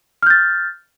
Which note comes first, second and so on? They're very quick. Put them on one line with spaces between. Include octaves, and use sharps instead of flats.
F6 G6 A6